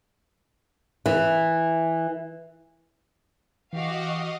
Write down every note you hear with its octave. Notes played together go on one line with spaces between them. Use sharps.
E3
E3 F#4 G4 D#5 F5